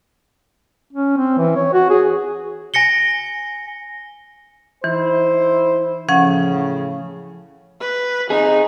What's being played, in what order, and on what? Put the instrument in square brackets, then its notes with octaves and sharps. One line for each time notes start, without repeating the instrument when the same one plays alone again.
[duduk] C#4
C4
E3
C#5
F#4
G#4
[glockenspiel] G#5 A#6 C#7 G7
[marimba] E3 [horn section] D#4 E4 C5
[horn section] A2 C#3 [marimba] F3 C#4 F#5
[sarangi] B4
[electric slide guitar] C4 G#4 [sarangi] D#4